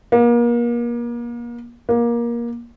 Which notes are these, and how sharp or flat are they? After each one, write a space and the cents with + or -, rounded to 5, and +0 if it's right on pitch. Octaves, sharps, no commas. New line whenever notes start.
A#3 +35
A#3 +20